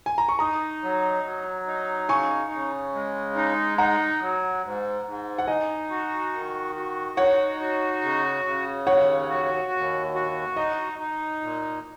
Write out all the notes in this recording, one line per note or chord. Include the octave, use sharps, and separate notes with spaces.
G#5
A#5
C#6
D#4 A#5 D#6
F#3
F#3
D#4
C#3 G#5 C#6
C#3
G#3
D#4
D#4 F#5 A#5
F#3
G#2
G#2
F#5
D#4 D#5 G#5
F#4
D#3
F#4
D#4 C#5 F#5
F#4
C#3
C#3
D#2 C#5 F#5
F#4
D#2
F#4
D#4 D#5
D#4
A#2